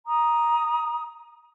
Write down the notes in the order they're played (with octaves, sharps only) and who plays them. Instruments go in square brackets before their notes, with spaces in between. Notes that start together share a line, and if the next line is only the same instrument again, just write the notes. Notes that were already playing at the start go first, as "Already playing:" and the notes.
[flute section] A#5 D#6